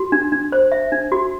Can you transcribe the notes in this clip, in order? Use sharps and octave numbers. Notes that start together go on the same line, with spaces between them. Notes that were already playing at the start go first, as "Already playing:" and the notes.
Already playing: F#4
D4
D4
C5
E5
D4
F#4